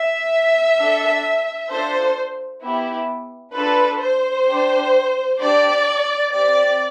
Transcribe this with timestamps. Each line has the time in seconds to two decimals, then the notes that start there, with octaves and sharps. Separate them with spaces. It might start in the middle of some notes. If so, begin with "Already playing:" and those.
Already playing: E5
0.77 D4 A4
1.69 D4 F4 A4 C5
2.62 B3 E4 G4
3.54 D4 F4 A4 B4
4.01 C5
4.47 D4 G4
5.39 D4 G4 D5
6.32 C4 G4 D5